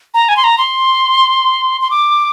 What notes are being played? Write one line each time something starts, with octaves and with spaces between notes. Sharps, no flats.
A#5
G#5
C6
A#5
C6
C6
D6